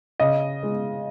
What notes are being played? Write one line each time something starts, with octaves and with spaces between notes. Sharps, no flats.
C#3 D#5
G#3